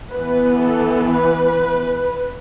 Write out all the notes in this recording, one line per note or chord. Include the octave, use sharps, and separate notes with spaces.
E3 B3 B4
A4
B4